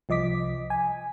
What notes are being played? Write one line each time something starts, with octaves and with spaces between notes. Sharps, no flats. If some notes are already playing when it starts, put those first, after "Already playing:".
C2 F3 D#5 D6 B6
G#5